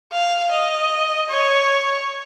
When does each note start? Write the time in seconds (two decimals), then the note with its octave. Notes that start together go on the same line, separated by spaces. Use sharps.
0.12 F5
0.51 D#5
1.29 C#5